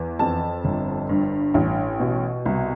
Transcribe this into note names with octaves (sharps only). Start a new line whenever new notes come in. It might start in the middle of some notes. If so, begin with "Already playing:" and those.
Already playing: E2
F2 A5
G1
G2
A1
B2
C2